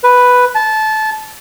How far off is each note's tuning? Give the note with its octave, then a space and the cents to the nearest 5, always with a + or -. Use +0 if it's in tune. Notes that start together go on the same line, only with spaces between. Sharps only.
B4 +0
A5 -20